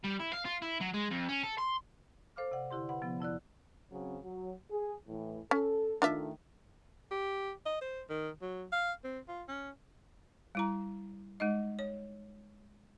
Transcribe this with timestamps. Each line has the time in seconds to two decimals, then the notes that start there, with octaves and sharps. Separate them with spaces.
0.04 G3
0.20 E4
0.33 F5
0.45 F4
0.62 E4
0.80 F#3
0.94 G#3
1.10 F2
1.29 C#4
1.43 A4
1.58 C6
2.36 A4 C5 F5 D6 F6
2.52 C3 D5 F#5
2.70 D3 E4 G4 C6
2.89 B4 F#5 B5
3.02 C3 F3 B3
3.20 F2 E4 D5 F#6
3.91 C#3 F#3 C4
4.23 F#3
4.70 G#4
5.07 A2 E3
5.51 C#4 A4
6.02 D#3 A3 D4 F4 E5
7.11 G4
7.65 D#5
7.81 C5
8.10 D#3
8.42 F#3
8.72 F5
9.04 C4
9.28 F4
9.48 C#4
10.55 G3 E4 A#5
11.40 G#3 D#4 D#5
11.79 C#5